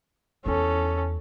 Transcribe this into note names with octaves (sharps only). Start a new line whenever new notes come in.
E2 C#4 E4 A4